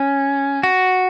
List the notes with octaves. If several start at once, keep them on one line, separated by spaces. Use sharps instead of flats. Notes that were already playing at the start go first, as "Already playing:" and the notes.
Already playing: C#4
F#4